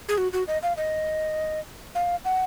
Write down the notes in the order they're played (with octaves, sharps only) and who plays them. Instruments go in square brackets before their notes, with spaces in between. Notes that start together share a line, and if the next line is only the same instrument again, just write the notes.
[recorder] G#4
F#4
F#4
D#5
F5
D#5
F5
F#5